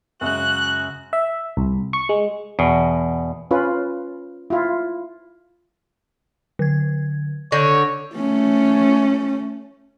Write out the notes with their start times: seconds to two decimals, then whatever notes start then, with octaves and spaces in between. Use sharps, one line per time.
0.21 F#2 C#3 G#3 F#4 F#6
1.13 E5
1.57 C2
1.93 C#6
2.09 G#3
2.59 E2 B2
3.51 C#4 F4 B4
4.50 E4 F4
6.59 D3 G#6
7.52 D3 C#5 G6 A#6
8.16 A3 C#4